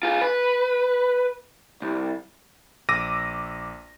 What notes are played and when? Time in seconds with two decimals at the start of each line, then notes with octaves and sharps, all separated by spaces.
0.03 F4 G#4
0.21 B4
1.82 C2
2.89 A#1 D6 E6 A#6 D#7